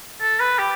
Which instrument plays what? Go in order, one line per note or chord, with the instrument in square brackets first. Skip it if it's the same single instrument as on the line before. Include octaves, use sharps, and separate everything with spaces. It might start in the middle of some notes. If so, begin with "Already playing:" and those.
[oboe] A4
B4
G4